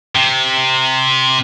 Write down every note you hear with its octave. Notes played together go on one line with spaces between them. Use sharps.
C3